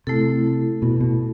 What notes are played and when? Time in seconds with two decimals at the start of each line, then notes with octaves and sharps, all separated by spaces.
0.07 C3 A3 E4 A4
0.82 B2
1.00 B2